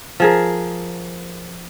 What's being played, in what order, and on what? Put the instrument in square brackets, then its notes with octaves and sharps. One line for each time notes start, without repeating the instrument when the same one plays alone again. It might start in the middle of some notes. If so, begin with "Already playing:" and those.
[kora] F3 G#4 A#4